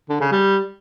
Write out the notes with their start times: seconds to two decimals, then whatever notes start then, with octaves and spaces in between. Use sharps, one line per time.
0.09 D3
0.20 C#3
0.31 G3